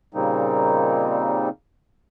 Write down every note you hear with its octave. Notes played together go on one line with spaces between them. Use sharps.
A#2 C#3 G3 A#3 C4 D#4